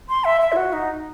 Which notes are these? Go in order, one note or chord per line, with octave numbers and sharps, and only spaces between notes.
C6
E5
E5
E4
F#4
D#4